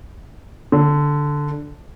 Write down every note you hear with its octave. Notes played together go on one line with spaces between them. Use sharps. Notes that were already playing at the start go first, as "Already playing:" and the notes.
D3